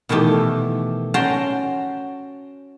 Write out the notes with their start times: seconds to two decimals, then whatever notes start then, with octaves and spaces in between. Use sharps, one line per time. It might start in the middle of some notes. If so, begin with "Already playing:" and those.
0.09 B2 D#3 E3 A3 G4
1.14 C#4 F#4 G5 A5 A#5 C6